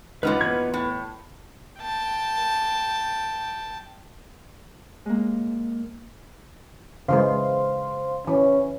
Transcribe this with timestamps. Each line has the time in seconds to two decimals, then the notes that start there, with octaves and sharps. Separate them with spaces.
0.23 C#2 A#2 B3 D#4 B4 F6
0.41 E2 G#6
0.74 A2
1.81 G5 A5
5.06 G#3 A#3
7.08 C#3 E3 G#3 C5 F5 C6
8.27 E3 C#4